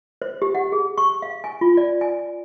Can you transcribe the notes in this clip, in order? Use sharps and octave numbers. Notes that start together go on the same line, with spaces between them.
C5
G4
F#5
G#4
C#6
F5
G#5
F4
D5
G#5